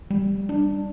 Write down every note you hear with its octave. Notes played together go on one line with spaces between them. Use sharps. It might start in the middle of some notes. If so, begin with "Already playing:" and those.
G3
D4